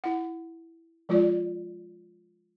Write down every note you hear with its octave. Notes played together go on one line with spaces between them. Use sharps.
E4 F#5
F3 G#3 F4 D5